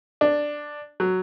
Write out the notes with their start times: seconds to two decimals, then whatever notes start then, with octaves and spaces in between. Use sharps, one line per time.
0.21 D4
1.00 F#3